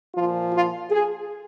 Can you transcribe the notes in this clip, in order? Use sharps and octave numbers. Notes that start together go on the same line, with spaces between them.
A#2 F3 F4
F4
G#4